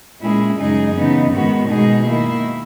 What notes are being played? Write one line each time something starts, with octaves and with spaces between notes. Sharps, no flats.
A#2 G#3 C#4 E4 G#4
F#2 C#3 G#3 D#4 G#4
C#3 E3 B3 D#4
G#2 D#3 G#3 B3 F#4
B2 G#3 D#4 G#4
D#3 A#3 E4